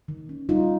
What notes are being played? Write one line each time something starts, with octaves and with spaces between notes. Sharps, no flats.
D#3
C#4
G3 D#4 F4